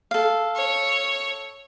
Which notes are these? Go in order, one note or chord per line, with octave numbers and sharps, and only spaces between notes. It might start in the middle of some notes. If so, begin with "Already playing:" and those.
A4 F5
C#5